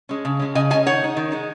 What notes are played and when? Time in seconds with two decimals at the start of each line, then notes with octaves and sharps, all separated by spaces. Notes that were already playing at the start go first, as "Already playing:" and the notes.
0.09 G#3 C#4
0.25 C#3
0.39 G#3 C#4
0.55 C#3 D#5 G#5
0.70 G#3 C#4 D#5 G#5
0.86 D#3 C#5 F#5
1.01 G#3 D#4
1.17 D#3
1.32 G#3 D#4